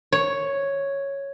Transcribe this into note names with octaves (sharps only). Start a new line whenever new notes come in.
C#5